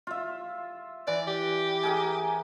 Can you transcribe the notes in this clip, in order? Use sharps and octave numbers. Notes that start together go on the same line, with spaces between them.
F4 E5
E3 D5
G4
G#4 A#4 A#5